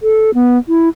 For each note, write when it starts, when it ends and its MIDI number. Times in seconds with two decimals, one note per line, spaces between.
0.03 0.30 69
0.34 0.58 59
0.68 0.89 64